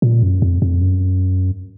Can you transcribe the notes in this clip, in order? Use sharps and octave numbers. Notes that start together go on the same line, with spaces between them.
A#2
F#2
F2
F2
F#2